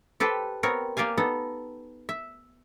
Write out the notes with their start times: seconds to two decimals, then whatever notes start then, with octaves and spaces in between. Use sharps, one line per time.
0.20 G4 A4 B4 C5 G5
0.63 B3 C4 A#4 C#5
0.97 A#3 G4 D5 F5 G#5
1.18 B3 D#4 A4
2.09 E5